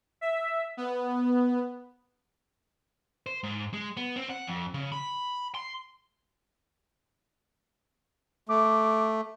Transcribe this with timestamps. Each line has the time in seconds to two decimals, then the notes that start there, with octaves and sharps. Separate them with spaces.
0.21 E5
0.77 B3
3.26 C5
3.43 G#2
3.74 G#3
3.97 B3
4.16 C4
4.29 F#5
4.47 F2
4.74 C#3
4.92 B5
5.55 C6
8.49 A3 D6